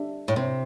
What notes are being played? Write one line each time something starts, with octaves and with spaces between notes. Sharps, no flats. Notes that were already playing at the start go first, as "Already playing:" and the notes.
Already playing: D4 G4 E5
A2
C3